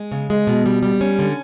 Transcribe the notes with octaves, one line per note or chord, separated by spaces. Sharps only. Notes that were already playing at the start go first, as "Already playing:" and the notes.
Already playing: G#3
C#3
G#3
B2
G3
G3
C#4
D3